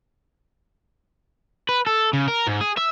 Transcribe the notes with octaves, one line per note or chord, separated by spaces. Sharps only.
B4
A4
C#3
A#4
G#2
G#4
E5